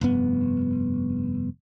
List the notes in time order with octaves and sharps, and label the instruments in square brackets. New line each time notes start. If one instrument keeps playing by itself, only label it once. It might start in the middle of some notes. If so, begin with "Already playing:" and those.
[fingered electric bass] F1 G2 B3